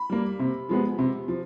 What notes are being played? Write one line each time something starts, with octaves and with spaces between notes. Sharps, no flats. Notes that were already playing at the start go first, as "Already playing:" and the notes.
Already playing: B5
G3 A#3
C3
F3 G#3 B3
C3
F3